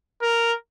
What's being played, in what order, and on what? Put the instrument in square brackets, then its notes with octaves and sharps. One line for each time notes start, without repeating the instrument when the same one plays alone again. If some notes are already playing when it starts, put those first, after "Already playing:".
[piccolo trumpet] A#4